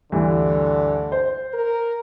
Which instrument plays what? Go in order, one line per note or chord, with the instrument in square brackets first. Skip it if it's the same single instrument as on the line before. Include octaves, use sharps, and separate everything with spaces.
[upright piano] D2 G2 E3 [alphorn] D3
[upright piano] C5
[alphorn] A#4